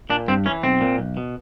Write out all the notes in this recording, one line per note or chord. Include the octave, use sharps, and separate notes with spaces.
A#2 D4
G2 C4
E3 C#4
B1 C4
A#2
B1
B2